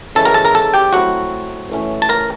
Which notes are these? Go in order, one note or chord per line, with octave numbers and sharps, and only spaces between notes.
C#3 E3 G#3 C#4 E4 A4 A5
A#4 A#5
A4 A5
A#4 A#5
A4 A5
G4 G5
F#3 A3 C4 E4 F#4 F#5
A2 E3 A3 C#4
A5
A#4 A#5